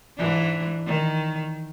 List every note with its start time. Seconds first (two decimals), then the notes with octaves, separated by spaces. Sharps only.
0.17 G#2 E3 D4
0.86 D#3